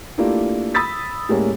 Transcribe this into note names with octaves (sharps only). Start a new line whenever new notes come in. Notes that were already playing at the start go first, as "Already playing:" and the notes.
A3 A#3 D4 E4 F4 G4
B5 D#6 E6 A6 B6
A2 G3 G#3 A#3 C#4